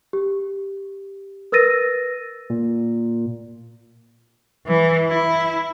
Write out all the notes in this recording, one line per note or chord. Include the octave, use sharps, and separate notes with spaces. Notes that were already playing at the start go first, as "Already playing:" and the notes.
G4
A#4 B4 E6 A6 A#6 D#7
A#2
E3
E4